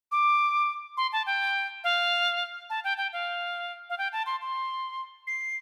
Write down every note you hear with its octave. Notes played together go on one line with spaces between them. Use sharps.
D6
C6
A5
G5
F5
A5
G5
G5
F5
F5
G5
A5
C6
C6
C7